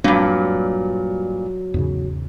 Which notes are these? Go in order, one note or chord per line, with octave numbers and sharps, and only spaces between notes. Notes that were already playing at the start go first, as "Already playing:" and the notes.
G2 A#2 F#3 G#3 C4 D4
E2 G#2 C#3